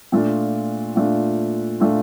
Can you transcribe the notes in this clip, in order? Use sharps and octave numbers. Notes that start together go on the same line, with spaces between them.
A#2 A3 D4 F4
A#2 A3 D4 F4
A#2 A3 D4 F4